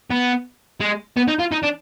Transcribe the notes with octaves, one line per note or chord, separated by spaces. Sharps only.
B3
G#3
B3
D#4
F4
D#4
D4